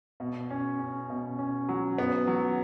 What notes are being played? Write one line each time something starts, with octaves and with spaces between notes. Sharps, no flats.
B2
C#4
C#4
B2
C#4
F#3
B3
F#3